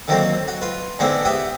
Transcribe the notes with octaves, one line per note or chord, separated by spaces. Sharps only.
D3 D#3 F#3 A#3 C4
F#4
F4 B4
G#2 D3 B3 C4 D4 E4
G4 E5 F#5 D#6